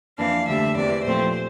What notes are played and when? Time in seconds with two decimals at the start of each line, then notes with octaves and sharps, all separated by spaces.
0.18 F2 E3 A#3 D4 F5
0.47 D2 D3 G3 D4 E5
0.75 E2 C3 E3 D5
1.04 A#2 F3 A3 C4 C5